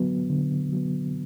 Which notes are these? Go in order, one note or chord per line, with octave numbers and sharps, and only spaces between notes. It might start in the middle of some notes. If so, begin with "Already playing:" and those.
Already playing: D3 F#3 B3
D3
F#3 B3